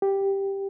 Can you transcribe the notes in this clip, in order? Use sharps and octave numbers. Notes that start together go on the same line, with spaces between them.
G4